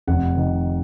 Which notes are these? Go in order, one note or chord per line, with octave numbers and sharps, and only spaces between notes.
F1 F#5
D#3